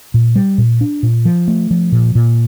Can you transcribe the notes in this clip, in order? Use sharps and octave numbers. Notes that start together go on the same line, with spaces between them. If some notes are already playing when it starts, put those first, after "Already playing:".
A#2
G3
A#2
D4
A#2
F3
A3
F3
A#2
A#2